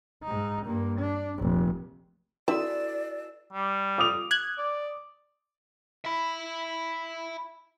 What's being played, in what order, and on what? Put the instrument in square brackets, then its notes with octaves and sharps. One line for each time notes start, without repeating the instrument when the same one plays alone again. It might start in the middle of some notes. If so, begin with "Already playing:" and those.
[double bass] G#2 D#4
G2 A#3
D4
F1 A#1
[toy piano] E4 F#4 A4 [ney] D5 [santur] E6
[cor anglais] G3
[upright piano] D6 D#6 F7
[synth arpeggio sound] F#6 G#6
[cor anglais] D5
[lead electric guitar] E5 B5